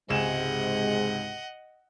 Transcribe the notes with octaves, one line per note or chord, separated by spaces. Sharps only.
C#2 G#2 C3 G#3 G#4 D#5 F#5 E7